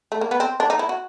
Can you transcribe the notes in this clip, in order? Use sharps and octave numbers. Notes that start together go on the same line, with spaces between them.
A3
A#3
B3
C4
D4
D#4
E4
F#4